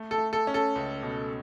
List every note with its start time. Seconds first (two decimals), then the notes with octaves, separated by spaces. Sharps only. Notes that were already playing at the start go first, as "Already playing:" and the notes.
Already playing: A3
0.11 A4
0.18 A3
0.33 A4
0.47 C#4
0.54 A4
0.76 C#2
1.03 B2